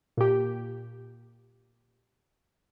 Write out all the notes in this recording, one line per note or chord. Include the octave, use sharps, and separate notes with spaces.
A#2 G4